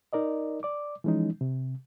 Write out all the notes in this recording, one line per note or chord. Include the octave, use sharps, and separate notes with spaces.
D#4 A#4 D5 D#5
D5 D6
E3 F3 G#3 C#4 D#4
C3